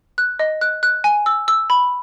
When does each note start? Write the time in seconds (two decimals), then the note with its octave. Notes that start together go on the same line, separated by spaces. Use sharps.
0.18 F#6
0.39 D#5
0.61 F#6
0.83 F#6
1.04 G#5
1.26 E6
1.48 E6
1.70 B5